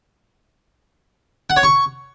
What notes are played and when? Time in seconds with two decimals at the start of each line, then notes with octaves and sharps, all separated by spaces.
1.50 F#5
1.57 C#5
1.63 C#6